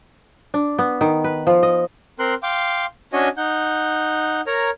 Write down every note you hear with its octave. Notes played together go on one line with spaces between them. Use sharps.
D4
B3
D#3
B4
F3
D#5
C4 A#4 C6 F#6
F5 G5 C6 D6
C#4 D4 F#4 C#5 D#5 G#5
D#4 F#5 G6
A#4 C#5 A#5